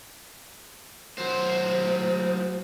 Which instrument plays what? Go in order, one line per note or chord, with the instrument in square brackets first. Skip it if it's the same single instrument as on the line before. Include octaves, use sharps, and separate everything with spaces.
[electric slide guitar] F#3 C5